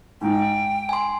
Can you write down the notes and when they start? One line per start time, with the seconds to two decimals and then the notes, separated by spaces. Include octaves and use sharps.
0.21 G#2 D#4 G5
0.89 G#5 C6